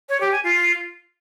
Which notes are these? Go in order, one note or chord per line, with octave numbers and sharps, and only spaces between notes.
C#5
G4
G#5
F4